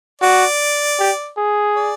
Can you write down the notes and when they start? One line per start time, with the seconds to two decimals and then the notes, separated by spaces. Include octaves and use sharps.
0.22 F#4 D5
0.99 G4
1.38 G#4
1.76 D5